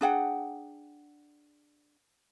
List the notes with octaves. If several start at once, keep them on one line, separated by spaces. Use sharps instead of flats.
D4 G#4 F#5 G5